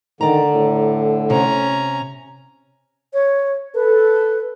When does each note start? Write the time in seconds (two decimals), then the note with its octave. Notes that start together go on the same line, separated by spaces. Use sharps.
0.21 D3 D#3 D5 A#5
0.54 A2
1.30 C3 C#4 A#5
3.14 C#5
3.75 A4 B4